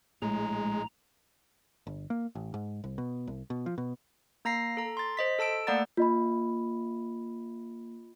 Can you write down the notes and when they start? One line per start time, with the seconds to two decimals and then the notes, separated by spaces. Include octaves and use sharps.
0.22 A#1 A2 G#3 A#5
1.87 G1
2.10 A#3
2.35 A1
2.54 G#2
2.84 C2
2.98 B2
3.27 C2
3.50 B2
3.66 F3
3.78 B2
4.45 A#3 A#5 A#6 C7
4.77 A4 A#5
4.97 C6 A6
5.17 C5 D#5 B6
5.39 A4 A5 E6 D7
5.67 A3 A#3 D5 F#5 A#5 A6
5.97 A#3 F4 D#5 B5